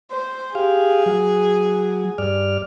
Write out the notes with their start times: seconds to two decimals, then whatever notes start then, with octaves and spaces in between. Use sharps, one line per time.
0.11 C5
0.55 G4 G#4 F5
1.06 F#3
2.18 G2 D5 F6